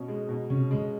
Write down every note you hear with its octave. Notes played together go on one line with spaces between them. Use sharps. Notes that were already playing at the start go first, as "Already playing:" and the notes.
Already playing: B2 C#4
G#3
B2
C3 C#4
G#3